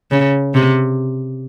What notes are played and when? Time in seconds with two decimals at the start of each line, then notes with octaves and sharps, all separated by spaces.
0.11 C#3
0.54 C3